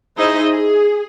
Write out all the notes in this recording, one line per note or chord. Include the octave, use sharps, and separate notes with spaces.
D#4 E4 G#4 C5 D#5 E5
G#4